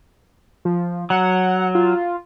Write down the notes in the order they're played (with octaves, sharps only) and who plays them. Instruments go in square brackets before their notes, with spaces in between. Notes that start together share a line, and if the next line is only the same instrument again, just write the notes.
[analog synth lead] F3
[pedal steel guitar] F#3 [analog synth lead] F#5
[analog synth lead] F4